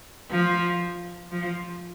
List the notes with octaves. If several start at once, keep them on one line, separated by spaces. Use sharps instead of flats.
F3
F3